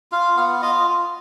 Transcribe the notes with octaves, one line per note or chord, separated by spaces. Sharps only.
F4 F5
B3 F5
F4 D#5